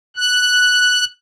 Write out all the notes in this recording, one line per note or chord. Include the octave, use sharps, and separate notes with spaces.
F#6